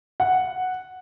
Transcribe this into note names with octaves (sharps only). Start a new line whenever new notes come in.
F#5